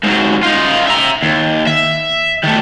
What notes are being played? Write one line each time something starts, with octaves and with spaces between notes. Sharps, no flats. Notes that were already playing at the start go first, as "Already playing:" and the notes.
G#2 F#3
D#4 F4
E5 A#5
D#2
E5
D#3 A3